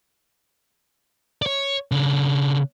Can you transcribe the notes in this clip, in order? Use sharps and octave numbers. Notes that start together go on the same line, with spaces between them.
C#5 D5
C#3 D4